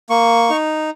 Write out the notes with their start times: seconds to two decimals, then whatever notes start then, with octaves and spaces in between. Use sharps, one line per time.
0.10 A#3 C#6
0.50 D#4